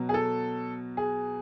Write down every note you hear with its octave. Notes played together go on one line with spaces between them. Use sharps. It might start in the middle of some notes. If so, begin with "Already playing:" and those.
Already playing: B2 F#3
G#4
A4
G#4